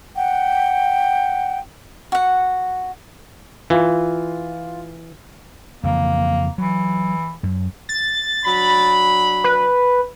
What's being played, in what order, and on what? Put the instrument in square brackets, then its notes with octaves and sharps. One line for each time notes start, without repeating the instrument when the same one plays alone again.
[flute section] F#5 G5
[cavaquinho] F#4 F#5
[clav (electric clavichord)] E3 [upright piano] F4
[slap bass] F2 C#3 E3 [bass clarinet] A#3
[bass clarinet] E3 [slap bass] F#3
[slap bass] F#2
[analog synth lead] A6
[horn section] F#3 D4 B5
[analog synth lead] B4